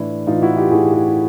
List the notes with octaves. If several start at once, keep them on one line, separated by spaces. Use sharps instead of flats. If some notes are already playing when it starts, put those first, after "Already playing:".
Already playing: A2 E3 D4 E4
A2 E3 D#4 F4
E4 F#4
F4 G4
A2 E3 F#4 G#4
F#4 G#4